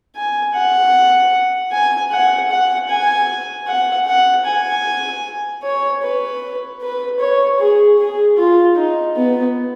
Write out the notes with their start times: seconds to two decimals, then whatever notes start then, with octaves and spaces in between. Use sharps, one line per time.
0.15 G#5
0.54 F#5
1.72 G#5
2.11 F#5
2.50 F#5
2.89 G#5
3.67 F#5
4.07 F#5
4.45 G#5
5.63 C#5
6.02 B4
6.81 B4
7.20 C#5
7.59 G#4
7.98 G#4
8.37 F4
8.76 D#4
9.16 B3